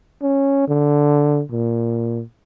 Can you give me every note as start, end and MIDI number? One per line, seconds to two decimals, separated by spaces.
0.22 0.67 61
0.68 1.42 50
1.52 2.23 46